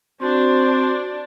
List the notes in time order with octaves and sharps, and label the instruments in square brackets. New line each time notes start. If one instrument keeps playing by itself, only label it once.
[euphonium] C4 [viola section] D4 [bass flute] F#4 [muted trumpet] C5